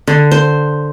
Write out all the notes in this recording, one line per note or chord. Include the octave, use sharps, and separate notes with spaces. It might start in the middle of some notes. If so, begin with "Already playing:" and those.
D3
C5